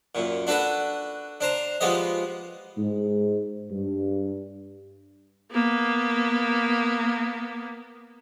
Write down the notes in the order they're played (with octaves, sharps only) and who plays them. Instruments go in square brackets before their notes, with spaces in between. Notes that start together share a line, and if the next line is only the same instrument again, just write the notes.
[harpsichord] F#2 A#2
D4 F#4 A4 B4 F#5
D4 C5 A#5
F3 G#3 B3 G4 D#5
[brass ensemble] G#2
G2
[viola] A#3 B3